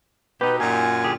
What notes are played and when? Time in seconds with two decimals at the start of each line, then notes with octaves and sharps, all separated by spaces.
0.41 B2 D#4 G4 B4
0.60 F#2 A#2 G#5
1.04 D3 G4 G#4